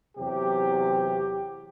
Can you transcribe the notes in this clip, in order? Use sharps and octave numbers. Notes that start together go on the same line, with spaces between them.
E2 C3 F#3 G4